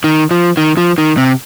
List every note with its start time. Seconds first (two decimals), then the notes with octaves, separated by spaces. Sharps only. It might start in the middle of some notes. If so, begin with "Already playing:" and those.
0.04 D#3
0.31 F3
0.57 D#3
0.77 F3
0.98 D#3
1.17 C3